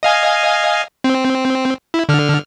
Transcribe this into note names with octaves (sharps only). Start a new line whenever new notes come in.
D#5 F5 G#5
C4
E4
D3 F6